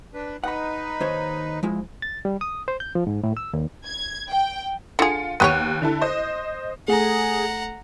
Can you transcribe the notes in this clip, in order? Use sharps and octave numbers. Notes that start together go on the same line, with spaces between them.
D4 B4
D#4 B4 F#5 B5
D#2 C5 C#5
F3 G#3 E4
A6
G3
D#6
C5
G6
F3
G#2
A2
E6
D#2
G#6
G5
D3 F4 G#4 C#7
D#2 B3 G4 C#5 F#6 D#7
D3 E4 A4
C5 D#5
A3 G#4 F#5 A#5